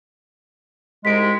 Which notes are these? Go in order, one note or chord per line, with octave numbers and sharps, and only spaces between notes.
C2 G#2 G#3 B6 D7